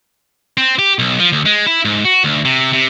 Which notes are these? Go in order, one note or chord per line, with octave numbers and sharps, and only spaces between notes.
C4
G4
B1
F3
D2
G#3
E4
G#2
F#4
D2
C3
C3